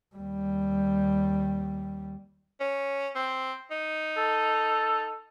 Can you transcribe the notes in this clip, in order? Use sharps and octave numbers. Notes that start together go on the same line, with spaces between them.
D#2 G3
C#4
C4
D#4
A4